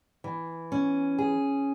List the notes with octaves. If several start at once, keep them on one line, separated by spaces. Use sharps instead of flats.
E3
C#4
G#4